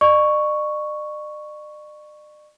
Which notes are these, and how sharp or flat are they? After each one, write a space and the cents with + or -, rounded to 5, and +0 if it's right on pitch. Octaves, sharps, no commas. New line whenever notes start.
D5 +45 C#6 +0